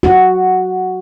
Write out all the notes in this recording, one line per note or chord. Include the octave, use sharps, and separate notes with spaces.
F#4